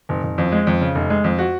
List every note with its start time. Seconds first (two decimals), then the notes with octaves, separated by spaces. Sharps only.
0.09 F#1
0.23 F#1
0.38 F2
0.52 G#3
0.67 F2
0.81 C#3
0.95 F1
1.10 G#3
1.24 F2
1.38 F#4